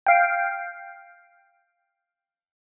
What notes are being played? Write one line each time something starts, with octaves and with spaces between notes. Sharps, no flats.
F5 G5